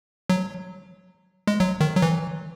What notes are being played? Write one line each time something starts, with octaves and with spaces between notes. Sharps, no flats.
F#3
G#3
F#3
D#3
F#3
E3